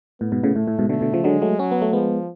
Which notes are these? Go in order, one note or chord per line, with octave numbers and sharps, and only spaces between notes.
A2 B3
G#2 B2
A2 C#3
A2 A3
A2
G#2 B2
B2 D3 A3
B2 D3
C#3 F3
D3 F#3 G#3
F#3 A3
F#3 C#4
B3
A3
F3 G#3 B3